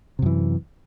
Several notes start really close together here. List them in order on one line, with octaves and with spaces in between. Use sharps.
C3 F#2 E3